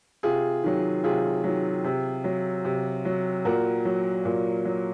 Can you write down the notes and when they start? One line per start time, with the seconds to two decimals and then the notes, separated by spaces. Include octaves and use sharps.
0.23 C3 F4 G#4
0.64 D#3 F#3
1.04 C3 F4 G#4
1.44 D#3 F#3
1.84 C3
2.24 F#3
2.65 C3
3.05 F#3
3.45 A#2 F#4 A#4
3.85 F#3
4.25 A#2
4.65 F#3